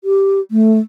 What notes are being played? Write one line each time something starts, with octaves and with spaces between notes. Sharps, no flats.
G4
A3